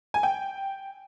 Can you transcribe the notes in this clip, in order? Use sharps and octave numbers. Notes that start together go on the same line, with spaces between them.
G#5
G5